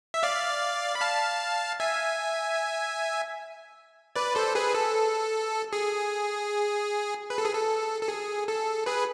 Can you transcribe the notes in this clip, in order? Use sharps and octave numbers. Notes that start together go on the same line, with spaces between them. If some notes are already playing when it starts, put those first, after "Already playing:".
E5
D5 F5
B5
F5 A5
E5 G#5
B4 D5
A4 C5
G#4 B4
A4
G#4
B4
A4
G#4
A4
A4
G#4
A4
G#4 B4